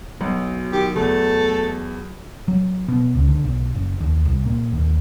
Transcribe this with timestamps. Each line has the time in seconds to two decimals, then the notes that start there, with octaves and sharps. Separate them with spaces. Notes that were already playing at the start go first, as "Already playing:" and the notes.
0.21 B1 F#3
0.72 D#3 G4
0.96 E2 A3 A4
2.48 F#3
2.89 B2
3.15 C#2
3.28 D3
3.44 B1
3.75 F#1
4.00 D#2
4.25 C2
4.45 A#2
4.73 D#2